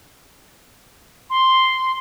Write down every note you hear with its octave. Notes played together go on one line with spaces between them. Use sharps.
C6